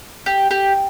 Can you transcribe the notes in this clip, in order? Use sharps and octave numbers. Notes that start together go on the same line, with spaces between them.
G4
G4